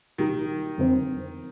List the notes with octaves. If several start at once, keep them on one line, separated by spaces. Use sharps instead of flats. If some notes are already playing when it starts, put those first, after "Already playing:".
C2 A#2 D#3 G3
F2 D3 F3 C4